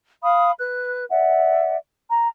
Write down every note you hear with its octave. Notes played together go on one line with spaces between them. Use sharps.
F5 B5 D#6
B4 F#6
D5 E5 F#5
A#5